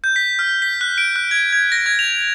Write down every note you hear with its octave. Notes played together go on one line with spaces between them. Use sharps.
G6
B6
F6
B6
F#6
D7
F#6
G#6
G#6
A#6
G#6
F7